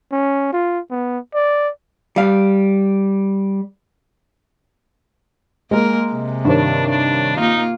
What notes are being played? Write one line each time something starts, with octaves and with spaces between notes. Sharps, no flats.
C#4
F4
B3
D5
G3 F5
G#3 A#3 A#4
C3
G2 D#3 D4 C#5
D4
A#3 D#4 F4